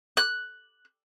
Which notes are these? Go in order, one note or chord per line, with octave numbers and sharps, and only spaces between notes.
F#6